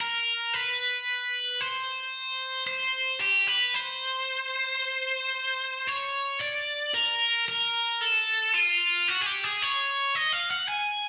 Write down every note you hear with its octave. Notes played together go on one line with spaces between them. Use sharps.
A#4
B4
C5
C5
G4
B4
C5
C#5
D5
A#4
A#4
A4
F4
F#4
G#4
G4
G#4
C#5
D#5
F5
F#5
G#5